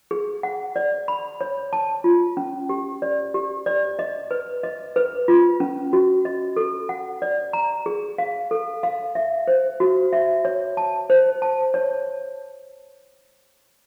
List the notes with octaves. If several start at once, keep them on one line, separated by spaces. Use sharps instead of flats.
G#4
F#5
D5
B5
C#5
A5
F4
C#4
G4
D5
G4
D5
D#5
B4
D#5
B4
F4
C#4
F#4
D#5
A4
F#5
D5
A#5
G#4
F5
A4
F5
E5
C5
F#4
E5
C#5
A5
C5
A5
C#5